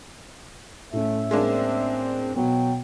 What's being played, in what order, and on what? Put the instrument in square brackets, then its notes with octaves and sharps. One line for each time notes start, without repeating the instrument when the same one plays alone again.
[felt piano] A2 C#4 [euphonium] A3 [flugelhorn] E5
[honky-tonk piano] G#3 A#3 D4 [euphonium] C4
[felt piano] B2 B3 [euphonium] F#3 [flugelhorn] G5